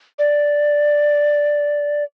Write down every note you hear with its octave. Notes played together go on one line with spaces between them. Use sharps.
D5